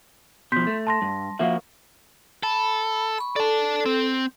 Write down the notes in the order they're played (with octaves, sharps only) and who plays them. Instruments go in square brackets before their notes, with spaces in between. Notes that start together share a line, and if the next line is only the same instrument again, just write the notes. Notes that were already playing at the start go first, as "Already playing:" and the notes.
[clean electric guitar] B2 F3 [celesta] C6 G6 B6
[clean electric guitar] A3
[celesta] A5 C6 A#6
[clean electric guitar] G2
[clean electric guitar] F3 A#3 F#4 [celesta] E5 F5
[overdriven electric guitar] A4 [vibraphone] B5
[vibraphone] B5 C#6
[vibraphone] A4 [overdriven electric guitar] D5 A5
[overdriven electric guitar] C4